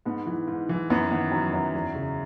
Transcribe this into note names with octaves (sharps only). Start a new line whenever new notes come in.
G#2 B3
E3
G#2
E3
F#2 B3
D#3 B3
F#3 C#4
F#2
E2
C#3